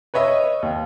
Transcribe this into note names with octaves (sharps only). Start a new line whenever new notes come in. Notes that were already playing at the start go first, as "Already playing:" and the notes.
B4 C#5 D#5 E5
D#2